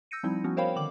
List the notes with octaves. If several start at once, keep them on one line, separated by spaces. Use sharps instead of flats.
E6 G6 A#6 C#7 D#7
F3 G3 C4 D#4 E4
F3 B3 C#4 F#4
A#4 C5 C#5 F5 G5 B5
D3 D#3 D6 F#7